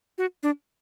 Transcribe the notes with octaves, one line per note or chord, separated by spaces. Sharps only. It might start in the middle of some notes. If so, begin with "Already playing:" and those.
F#4
D4